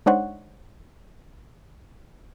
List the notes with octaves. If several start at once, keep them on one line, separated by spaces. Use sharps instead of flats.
G#3 D4 D#4 C5 C#5 F#5